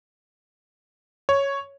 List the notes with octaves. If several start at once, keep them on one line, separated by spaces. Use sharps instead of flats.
C#5